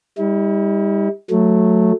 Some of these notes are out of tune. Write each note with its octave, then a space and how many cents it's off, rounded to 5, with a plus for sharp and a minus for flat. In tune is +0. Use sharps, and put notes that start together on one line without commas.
G3 +25 E4 -45
F#3 -10 A3 +0